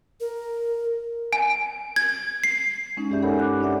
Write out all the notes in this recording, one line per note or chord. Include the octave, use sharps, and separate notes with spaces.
A#4
G#5
G#6
C7
G#3 C#4 D#4
G2 G4 G#4 D5 E5 G6
A4 A#4 C#5 F#5 G#5 B5
D6 F#6
D4 G4 D5 E5 F#5